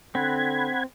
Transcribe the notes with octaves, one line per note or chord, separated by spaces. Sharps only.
D3 C4 F#5 B5 G#6